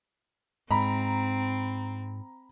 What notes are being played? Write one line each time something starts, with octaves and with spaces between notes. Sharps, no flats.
G#2 C4 A#5 B5